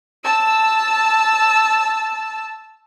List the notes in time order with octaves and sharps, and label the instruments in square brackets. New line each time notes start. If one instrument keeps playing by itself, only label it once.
[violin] A5 E6